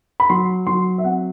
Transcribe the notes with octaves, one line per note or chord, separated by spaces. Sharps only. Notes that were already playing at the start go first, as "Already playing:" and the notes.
B5
F#3 C6
F#3 C6
E5
C4 F#5